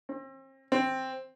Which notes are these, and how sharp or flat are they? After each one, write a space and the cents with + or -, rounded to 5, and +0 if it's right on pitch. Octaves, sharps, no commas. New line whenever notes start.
C4 +40
C4 +5